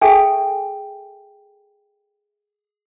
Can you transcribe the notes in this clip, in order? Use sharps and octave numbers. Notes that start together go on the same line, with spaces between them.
G#4 A4 E5 G5 G#5